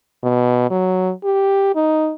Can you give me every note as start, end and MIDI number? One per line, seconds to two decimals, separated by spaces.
0.23 0.69 47
0.70 1.12 54
1.24 1.71 67
1.75 2.13 63